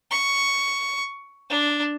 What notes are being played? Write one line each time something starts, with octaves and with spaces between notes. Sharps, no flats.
C#6
D4